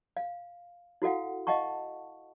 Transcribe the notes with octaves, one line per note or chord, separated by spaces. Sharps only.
F5
E4 F#4 A4 F5 F#5
D#5 F5 F#5 A5 C#6